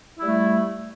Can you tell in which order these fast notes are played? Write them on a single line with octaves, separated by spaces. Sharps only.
E4 G3 A3